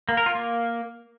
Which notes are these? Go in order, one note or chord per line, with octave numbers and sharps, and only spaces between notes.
A#3
A#4
F4
A#3